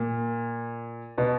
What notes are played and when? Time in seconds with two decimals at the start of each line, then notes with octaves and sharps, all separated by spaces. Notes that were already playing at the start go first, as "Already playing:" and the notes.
Already playing: A#2
1.18 B2 B3